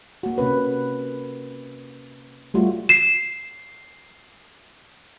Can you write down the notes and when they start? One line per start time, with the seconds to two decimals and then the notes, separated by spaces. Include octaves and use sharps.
0.23 A#3 F#4
0.38 C3 C#4 B4
2.54 G3 A3 F4 F#4
2.89 C7 E7